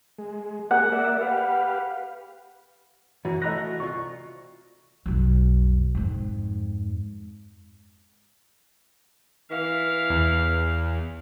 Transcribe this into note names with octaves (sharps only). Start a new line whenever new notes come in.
G#3
A#3 G4 G#4 F#5
A#3 D5 E5
G4 B4 F5
F#2 B2 E3 F#4
E3 A3 D#5 A#5 B5 F#6 A#6
C2 F4 C#6
B1 F2
F2 G#2
E3 F5
E2